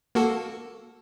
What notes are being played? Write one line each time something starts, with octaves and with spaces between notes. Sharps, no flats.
A#3 F#4 A4